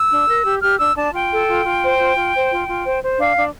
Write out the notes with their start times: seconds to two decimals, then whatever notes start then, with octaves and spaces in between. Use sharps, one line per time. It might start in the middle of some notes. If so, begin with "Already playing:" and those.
Already playing: E6
0.10 D4
0.28 A#4
0.45 G4
0.62 G4 F6
0.79 D4 E6
0.96 D4 A5
1.13 F4 G5
1.31 A4
1.48 F4
1.65 F4
1.82 C5
1.99 F4
2.16 F4
2.34 C5
2.51 F4
2.68 F4
2.85 C5
3.02 C5
3.19 D4 F5
3.37 D4